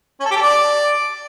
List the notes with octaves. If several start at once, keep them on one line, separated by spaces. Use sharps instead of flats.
C#4
A4
G4
A4
D5